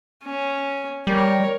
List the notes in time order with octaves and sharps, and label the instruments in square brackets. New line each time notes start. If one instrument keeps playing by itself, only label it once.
[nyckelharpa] C#4
[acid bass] G3 [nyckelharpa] A#4 C#5